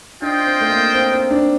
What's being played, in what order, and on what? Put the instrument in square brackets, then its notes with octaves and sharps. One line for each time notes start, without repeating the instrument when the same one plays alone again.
[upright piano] D4 [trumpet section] F4 C5 D#5 G5
[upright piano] C4
A3
A#3
C4
C4
D4